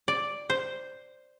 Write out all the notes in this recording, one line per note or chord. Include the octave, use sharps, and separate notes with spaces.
D5
C5